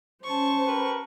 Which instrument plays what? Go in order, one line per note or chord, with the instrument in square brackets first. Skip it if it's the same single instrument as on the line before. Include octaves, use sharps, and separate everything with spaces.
[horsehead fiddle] C#4 C5 [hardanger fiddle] A5 C#6
[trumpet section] G4 A#4 B4